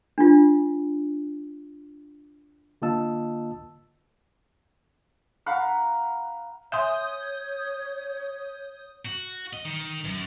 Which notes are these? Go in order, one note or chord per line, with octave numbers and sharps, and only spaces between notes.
D4 F4
D3 A#3 F4 D#5 A5 E6
F5 F#5 A#5 B5
C#5 E5 G#5 C6 D#6 G6
F#4
D#5
D#3
F#2